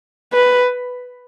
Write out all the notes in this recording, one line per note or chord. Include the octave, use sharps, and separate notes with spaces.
B4